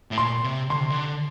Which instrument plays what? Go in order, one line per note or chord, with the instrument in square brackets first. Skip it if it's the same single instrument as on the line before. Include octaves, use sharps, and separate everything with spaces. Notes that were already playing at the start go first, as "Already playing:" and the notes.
[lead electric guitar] A2
[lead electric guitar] A#2 [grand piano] C6
[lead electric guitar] C3
[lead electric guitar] D3 [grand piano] C6
[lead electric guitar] C3
D3